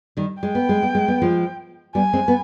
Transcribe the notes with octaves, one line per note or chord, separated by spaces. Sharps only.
D#3 G3
G#3 G5
B3
G#3
B3
G#3
B3
F3 G#3
G3 B3 G#5
G#3 C4
B3